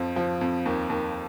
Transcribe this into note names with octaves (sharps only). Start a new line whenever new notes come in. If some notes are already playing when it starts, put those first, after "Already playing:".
Already playing: F2 F3
F3
F2
D#2
D#2